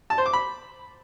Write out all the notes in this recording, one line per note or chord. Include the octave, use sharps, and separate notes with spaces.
A5
C5
D6
B5